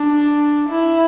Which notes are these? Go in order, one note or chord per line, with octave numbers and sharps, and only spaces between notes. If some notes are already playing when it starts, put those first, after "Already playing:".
Already playing: D4
E4